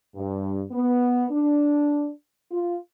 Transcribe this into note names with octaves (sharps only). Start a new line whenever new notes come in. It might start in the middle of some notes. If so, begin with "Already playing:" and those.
G2
B3
D4
F4